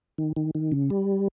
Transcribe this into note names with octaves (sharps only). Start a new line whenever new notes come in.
D#3
D#3
D#3
C#3
G3